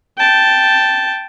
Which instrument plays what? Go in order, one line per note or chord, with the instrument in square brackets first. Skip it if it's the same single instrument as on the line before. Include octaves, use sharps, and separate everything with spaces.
[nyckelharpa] G5 A5